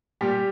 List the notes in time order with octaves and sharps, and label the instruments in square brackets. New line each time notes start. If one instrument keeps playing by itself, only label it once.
[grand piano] A#2 G3 G4